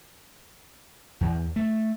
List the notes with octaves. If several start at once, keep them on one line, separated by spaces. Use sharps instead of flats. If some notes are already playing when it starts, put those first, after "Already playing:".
E2
A3